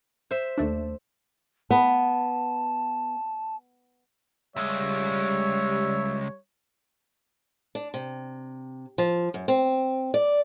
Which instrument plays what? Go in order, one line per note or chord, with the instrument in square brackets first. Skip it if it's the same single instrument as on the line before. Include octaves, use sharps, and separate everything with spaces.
[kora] C5 E5
[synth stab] D#2 A3 D4
[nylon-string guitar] B3 [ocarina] A5
[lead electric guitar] C#2 G#3 [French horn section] G3 [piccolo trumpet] C#5 [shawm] E5
[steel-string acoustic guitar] D4
C3
F3
F#2
C4
D5